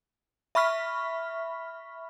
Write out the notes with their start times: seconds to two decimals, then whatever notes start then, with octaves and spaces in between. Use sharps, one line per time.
0.55 E5 B5 C#6 F6 B6